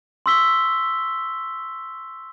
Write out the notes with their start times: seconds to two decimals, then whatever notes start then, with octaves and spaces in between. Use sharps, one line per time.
0.26 C6 C#6 E6 B6 G7